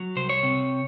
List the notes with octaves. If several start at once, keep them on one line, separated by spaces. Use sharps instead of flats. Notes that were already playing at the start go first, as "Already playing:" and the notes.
Already playing: F#3
C2 C5
C#5
C3